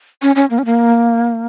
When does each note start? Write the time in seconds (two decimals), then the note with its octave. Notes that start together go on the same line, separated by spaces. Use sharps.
0.22 C#4
0.36 C#4
0.50 A#3
0.58 C#4
0.65 A#3